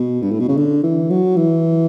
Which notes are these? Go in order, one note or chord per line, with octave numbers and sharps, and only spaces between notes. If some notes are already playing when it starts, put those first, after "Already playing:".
Already playing: B2
G2
A2
B2
C#3
D3
E3
F#3
E3